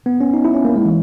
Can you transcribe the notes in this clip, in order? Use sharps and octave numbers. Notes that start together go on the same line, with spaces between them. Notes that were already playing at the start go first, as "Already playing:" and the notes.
B3
C#4
D#4
E4
C#4
A#3
G#3
E3